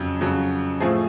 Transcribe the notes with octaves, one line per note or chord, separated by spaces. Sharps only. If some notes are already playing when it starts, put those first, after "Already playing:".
Already playing: F2 C#3 F#3
F2 C#3 F#3
A2 F3 A3 C4 G#4 G#5